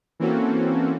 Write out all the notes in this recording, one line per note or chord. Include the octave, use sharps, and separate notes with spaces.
E3 A#3 C4 C#4 F#4 A4